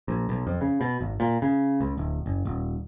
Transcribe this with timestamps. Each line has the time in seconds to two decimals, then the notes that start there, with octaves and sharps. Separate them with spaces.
0.08 A#1
0.29 B1
0.47 F2
0.61 C#3
0.81 B2
1.01 G#1
1.20 A#2
1.42 C#3
1.81 C#2
1.98 D1
2.26 F#1
2.45 D#1